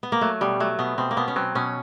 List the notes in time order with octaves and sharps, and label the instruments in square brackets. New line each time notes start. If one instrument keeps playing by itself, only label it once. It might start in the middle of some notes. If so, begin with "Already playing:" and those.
[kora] B3
A#3
[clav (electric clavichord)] F#3 [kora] A3
[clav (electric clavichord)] B2 [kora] G3
[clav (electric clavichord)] F#3 [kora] A3
[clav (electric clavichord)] B2 [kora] B3
[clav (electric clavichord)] B2 [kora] C4
[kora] A#3
[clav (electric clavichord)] B2 [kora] B3
[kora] C#4
[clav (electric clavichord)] F#3 [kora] C4
[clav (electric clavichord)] B2 [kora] C#4